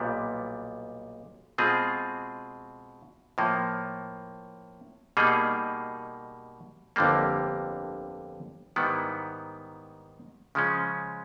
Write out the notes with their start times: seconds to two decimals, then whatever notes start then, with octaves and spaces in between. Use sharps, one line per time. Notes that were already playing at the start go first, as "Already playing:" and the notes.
Already playing: B1 A#2 G3 B3
1.58 B2 G#3 C4 F4 G#4
3.38 A2 F3 A#3
5.17 B2 G3 A#3 D#4 G#4
6.96 G1 F2 D3 G3 A#3
8.76 G#2 D#3 G3 B3 E4
10.55 C#3 F3 G#3 C#4